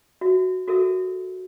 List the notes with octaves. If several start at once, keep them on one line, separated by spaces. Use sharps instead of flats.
F#4 E5
F#4 A4 A#4 E5